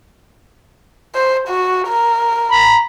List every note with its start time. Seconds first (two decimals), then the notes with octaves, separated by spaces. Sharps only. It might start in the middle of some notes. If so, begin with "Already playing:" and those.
1.15 C5
1.48 F#4
1.88 A#4
2.52 A#5 B5